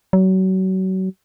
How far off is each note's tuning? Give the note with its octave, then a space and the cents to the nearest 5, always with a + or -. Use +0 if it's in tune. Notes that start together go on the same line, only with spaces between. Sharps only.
F#3 +30